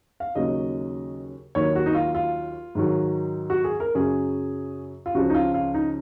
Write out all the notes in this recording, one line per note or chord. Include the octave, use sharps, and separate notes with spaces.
F5
D#2 C#3 F#3 D#5
D#2 D#3 F#3 C#5
F#4
D#4
F4
F4
G#2 D#3 F#3
F#4
G#4
A#4
F#2 C#3 F#3 G#4
F4
C#2 C#3 F3 F#4
D#4
F4
F4
D#4